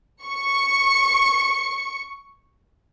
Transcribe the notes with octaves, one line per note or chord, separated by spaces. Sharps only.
C#6 C#7